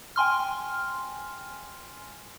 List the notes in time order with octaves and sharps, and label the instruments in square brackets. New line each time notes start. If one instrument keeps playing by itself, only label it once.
[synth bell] G5 G#5 C6 F6